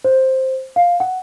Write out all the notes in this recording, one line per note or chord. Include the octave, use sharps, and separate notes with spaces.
C5
F5
F#5